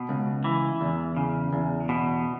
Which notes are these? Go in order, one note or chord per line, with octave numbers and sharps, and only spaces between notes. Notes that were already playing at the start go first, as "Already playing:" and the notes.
Already playing: B2
C#2
E3
E2
C#3
E2
B2